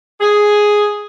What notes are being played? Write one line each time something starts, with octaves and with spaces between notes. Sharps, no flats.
G#4